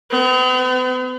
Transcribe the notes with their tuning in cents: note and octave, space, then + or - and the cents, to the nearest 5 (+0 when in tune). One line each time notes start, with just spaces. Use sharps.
B3 +45